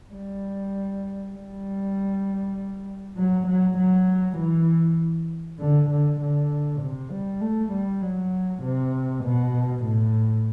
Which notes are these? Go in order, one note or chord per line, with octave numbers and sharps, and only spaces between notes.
G3
G3
F#3
F#3
F#3
E3
D3
D3
D3
C3
G3
A3
G3
F#3
C3
B2
A2